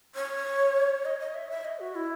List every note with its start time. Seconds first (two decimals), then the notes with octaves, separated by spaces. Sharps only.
0.15 C#5
1.05 D#5
1.20 D#5
1.35 E5
1.50 E5
1.65 D#5
1.79 F#4
1.95 E4